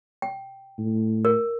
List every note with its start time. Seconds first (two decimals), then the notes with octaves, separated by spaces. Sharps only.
0.22 G5
0.78 A2
1.25 A#4